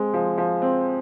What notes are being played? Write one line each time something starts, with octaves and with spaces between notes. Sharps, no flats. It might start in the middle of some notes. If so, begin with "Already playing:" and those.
Already playing: G#3 C4
F3
F3
C4